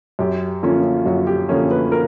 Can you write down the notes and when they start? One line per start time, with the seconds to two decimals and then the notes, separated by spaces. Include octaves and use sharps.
0.19 F#2 G4
0.63 D3 F3 A#3 C#4 F4
1.06 F#2 F#4
1.27 G4
1.49 D3 F3 A#3 C#4
1.71 B4
1.92 A#4